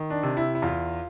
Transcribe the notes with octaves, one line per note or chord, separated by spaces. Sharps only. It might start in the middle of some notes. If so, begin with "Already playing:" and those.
Already playing: D#3
D4
C3
E4
E4
E2 F4